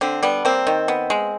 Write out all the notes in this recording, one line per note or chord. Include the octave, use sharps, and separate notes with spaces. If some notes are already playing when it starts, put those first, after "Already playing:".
D3 C4
G3 B3
A#3 C4
D#3
B3
G#3